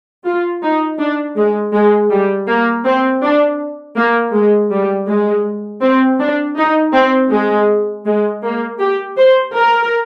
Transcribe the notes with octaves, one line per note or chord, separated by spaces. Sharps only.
F4
D#4
D4
G#3
G#3
G3
A#3
C4
D4
A#3
G#3
G3
G#3
C4
D4
D#4
C4
G#3
G#3
A#3
G4
C5
A#4